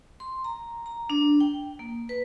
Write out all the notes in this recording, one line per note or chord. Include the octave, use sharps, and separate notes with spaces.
C6
A#5
A#5
D4
G5
A#3
B4